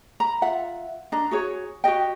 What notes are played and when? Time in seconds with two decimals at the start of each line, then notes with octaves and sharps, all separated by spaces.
0.20 A#5 B5
0.42 F4 E5 F#5
1.12 D4 D#5 A#5
1.31 F#4 G#4 C#5
1.84 F#4 G4 D#5 G5